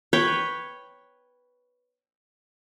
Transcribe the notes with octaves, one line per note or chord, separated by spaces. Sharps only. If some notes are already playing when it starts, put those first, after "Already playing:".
B4 C#5 G5